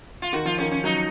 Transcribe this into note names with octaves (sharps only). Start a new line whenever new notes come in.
F4
D#3 F#4
F3 F4
D#3 C#4
C#4
F#3 D#4